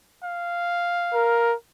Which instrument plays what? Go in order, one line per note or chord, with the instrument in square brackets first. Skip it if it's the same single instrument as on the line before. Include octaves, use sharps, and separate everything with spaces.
[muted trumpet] F5
[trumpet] A#4